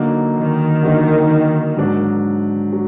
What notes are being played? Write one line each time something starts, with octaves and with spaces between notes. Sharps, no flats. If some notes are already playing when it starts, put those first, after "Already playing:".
Already playing: D3 F#3 A#3 D#4
D#3
D3 F#3 A#3 D#4
G#2 F#3 D4
F#3